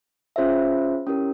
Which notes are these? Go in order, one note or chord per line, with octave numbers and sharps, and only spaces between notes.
C#4 F4 G#4 C5 E5
C#4 E4 G4 A#4